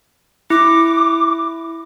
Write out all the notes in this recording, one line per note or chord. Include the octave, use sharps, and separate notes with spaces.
E4 D6